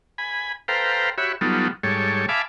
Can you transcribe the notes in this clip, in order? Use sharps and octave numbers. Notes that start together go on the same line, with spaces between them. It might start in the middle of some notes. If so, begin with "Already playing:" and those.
G#5 B5
A4 B4 C5 F5 G5 A#5
F#4 G4 C#5 E5 B5
F#3 G3 B3 D#4 F4 A4
G#2 G3 A4 C#5
E5 F5 G#5 A5 B5 D6